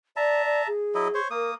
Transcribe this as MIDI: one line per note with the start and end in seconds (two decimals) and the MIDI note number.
0.16 0.42 74
0.16 0.68 76
0.16 0.68 81
0.16 0.68 82
0.44 0.61 74
0.66 1.19 68
0.95 1.08 54
0.95 1.08 64
0.95 1.08 75
1.14 1.28 72
1.14 1.28 73
1.30 1.54 58
1.30 1.50 70
1.30 1.54 87